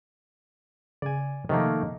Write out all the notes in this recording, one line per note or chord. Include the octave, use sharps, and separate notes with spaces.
C#3 D5 G#5
C3 D#3 F3 A3 A#3